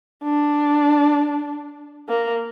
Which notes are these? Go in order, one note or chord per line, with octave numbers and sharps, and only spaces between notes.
D4
A#3